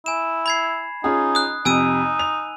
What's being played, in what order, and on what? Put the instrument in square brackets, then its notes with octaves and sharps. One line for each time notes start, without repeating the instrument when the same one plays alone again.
[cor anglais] E4 [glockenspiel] G#5 E7
[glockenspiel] B5 G#6 C7
[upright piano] C#4 F4 G#4 [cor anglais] D#4
[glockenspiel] D#6 F#6
[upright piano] F2 C3 [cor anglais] D#4 [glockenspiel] G#5 E6 D#7
[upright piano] F7